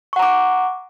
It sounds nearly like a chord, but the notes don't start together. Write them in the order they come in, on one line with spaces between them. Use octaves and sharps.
C#6 F#5 A#5 D6